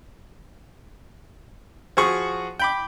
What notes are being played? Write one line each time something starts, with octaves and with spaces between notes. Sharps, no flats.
F3 F#4 G#4 C#6
G5 B5 D6